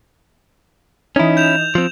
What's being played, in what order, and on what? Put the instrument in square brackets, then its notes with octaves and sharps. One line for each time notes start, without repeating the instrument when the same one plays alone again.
[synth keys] E3 D#4 [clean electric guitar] C#4 E4
[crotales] G6 E7 F7
[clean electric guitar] F3 C4